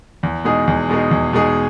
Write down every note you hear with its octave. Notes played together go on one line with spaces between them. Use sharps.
E2
B2 G#3 D#4 G#4
E2
B2 G#3 D#4 G#4
E2
B2 G#3 D#4 G#4